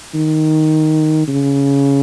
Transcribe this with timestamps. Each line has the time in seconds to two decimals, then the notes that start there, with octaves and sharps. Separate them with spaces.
0.15 D#3
1.28 C#3